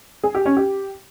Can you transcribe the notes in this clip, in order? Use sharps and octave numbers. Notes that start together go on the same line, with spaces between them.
G#4
G4
C#4
G4